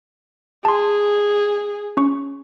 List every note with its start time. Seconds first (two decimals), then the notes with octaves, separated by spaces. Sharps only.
0.65 G#4 A5 C6
1.97 C#4 C#6